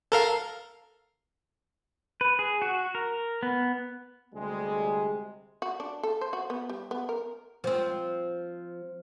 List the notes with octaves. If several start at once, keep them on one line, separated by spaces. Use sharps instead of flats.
A4 A#4 F5
B4
G#4
F#4
A#4
B3
D2 C3 G3 G#3
F#4
D4
A4
C5
F#4
B3
G3
B3
A#4
F3 C4